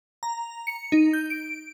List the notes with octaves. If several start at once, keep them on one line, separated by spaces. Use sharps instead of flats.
A#5
C#7
D#4
G6
D7